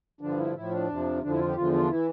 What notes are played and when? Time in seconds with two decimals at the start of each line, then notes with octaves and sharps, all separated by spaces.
0.21 G2 D3 F3 D4
0.37 E4
0.54 A2 F3 E4
0.71 D4
0.88 F2 C3 F3
1.22 F2 D3 F3 D4
1.30 E4
1.38 F4
1.47 G4
1.55 E2 D3 F3 F4
1.73 F4
1.83 D4
1.89 E3 E4